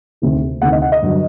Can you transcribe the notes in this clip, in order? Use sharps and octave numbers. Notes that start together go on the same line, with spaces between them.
D2 C3 D#3
D2 C3 D#3 F#5
D#5
F#5
D#5
G2 D3 F#3